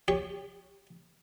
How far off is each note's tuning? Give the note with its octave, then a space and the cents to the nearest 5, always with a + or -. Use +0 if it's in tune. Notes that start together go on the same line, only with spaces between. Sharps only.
G4 +20 C#5 +0